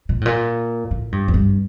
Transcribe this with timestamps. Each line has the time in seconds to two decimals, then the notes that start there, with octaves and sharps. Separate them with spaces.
0.09 A#2
0.21 A2
0.26 A#2
0.91 A2
1.12 G2
1.28 F2
1.34 G2